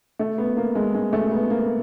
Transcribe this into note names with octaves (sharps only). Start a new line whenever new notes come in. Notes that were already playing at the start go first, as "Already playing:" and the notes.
A3
B3
A#3
G#3
G#3
A3
B3
A#3